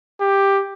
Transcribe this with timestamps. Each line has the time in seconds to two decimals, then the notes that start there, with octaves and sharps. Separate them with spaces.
0.21 G4